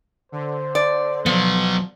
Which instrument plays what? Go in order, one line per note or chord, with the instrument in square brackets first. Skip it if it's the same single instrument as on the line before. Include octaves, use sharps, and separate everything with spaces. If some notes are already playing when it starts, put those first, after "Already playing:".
[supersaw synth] D3 [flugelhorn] C5
[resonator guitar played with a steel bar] D5
[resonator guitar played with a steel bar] F3 [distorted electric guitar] F#3 B3